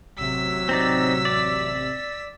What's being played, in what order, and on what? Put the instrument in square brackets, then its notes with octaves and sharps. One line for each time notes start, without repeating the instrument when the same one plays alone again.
[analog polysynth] A1 C3 [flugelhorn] F#3 [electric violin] E6 B6
[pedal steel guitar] C4 D#4 D5
D5